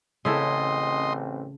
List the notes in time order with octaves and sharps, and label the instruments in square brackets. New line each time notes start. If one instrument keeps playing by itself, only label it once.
[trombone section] A1 C4 [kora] C#3 E4 A4 [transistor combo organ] D#5 C6